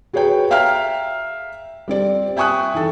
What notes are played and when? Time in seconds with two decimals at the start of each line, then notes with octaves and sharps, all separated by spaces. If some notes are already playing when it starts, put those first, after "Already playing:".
0.13 F#4 G#4 B4 C#5 G5
0.51 E5 F5 G5 A#5 F6
1.88 G3 C4 D5
2.37 E5 G5 G#5 C#6 D#6 F#6
2.74 E3 D#4 A4